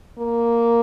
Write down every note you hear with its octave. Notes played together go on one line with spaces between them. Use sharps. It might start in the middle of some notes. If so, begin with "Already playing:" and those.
A#3